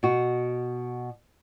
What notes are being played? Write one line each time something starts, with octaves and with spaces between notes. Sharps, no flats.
B2 F#4